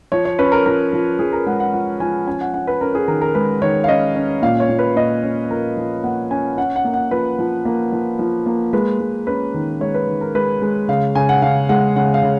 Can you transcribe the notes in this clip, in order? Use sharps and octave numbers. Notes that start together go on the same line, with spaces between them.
F3 C#5
C#5
C#4 B4
A#4
F3 A#4
F3
F3 G#4
A#4
G#3 F#5
F#5
F3 F#5
F3 G#5
C#4 G#5
F#5
C#4 F#5
B4
C#4 A#4
G#4
D#3 A#4
A#4
G#3 B4
D#3 C#5
F5
C#4 D#5
C#4
A#2 F5
C#5
A#2
B4
A#2 D#5
C#4
F3 A#4
F3
A#3 F#5
C#4 G#5
C#4 F#5
F#5
A#3
F#5
F3 B4
F3
A#3
F3
F3
A#3
G#3 B4
G#3
C#4 B4
D#3
G#3 C#5
B4
D#3
A#4
G#3 B4
G#3
C#3 F5
C#3 G#5
F#5
C#3 F5
G#3 F#5
C#3 F#5
F5
C#3